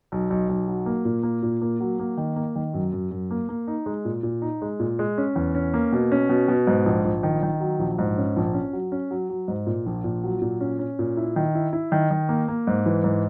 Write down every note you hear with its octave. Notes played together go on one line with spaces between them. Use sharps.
B1
B1
B1
F#3
A#3
A#2
A#3
A#2
A#3
F#3
A#3
D#3
A#3
D#3
F#2
F#2
F#2
A#3
A#3
D#4
G#3
A#2
A#2
D#4
G#3
A#2
G#3
C#4
E2
C#4
A#3
B2
C#4
B2
B2
G#2
A#1
A#1
D#3
D#3
F#3
A#1
G#2
C#4
A#1
C#4
F#3
C#4
F#3
F#3
G#2
A#2
A#1
A#2
F#3
A#2
C#4
C#4
A#2
E4
D#3
E4
E4
D#3
D#3
A#3
A#3
G#2
E3
G#2